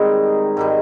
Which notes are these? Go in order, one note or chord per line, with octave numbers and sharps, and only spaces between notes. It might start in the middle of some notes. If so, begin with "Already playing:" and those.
Already playing: G#2 D#3 G3 C4 D#4
G#2 D#3 G3